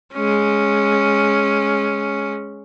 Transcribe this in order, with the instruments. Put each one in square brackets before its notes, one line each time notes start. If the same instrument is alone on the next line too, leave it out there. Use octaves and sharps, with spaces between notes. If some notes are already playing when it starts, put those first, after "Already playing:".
[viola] G#3 C#4